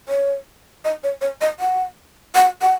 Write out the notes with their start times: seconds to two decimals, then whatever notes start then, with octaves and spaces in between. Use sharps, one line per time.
0.09 C#5
0.85 D#5
1.04 C#5
1.21 C#5
1.41 D#5
1.60 F#5
2.35 F#5
2.62 F#5